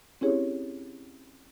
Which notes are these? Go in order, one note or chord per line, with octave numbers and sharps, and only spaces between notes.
C4 C#4 E4 G4 G#4 C#5